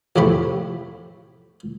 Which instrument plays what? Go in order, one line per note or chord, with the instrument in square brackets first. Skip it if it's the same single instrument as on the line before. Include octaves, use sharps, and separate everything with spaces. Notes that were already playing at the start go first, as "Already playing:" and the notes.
[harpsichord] A1 E2 A2 C3 B5 C#6